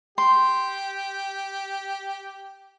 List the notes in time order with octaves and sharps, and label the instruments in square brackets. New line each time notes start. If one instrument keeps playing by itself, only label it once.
[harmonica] G4 [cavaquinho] C6